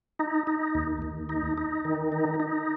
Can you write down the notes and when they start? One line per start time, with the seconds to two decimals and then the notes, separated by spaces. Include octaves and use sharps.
0.19 D#4
0.47 D#4
0.75 D#2
1.02 D#2
1.29 D#4
1.57 D#4
1.85 D#3
2.12 D#4
2.40 D#4